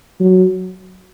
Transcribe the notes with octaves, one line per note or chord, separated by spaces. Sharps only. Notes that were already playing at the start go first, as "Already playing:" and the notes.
F#3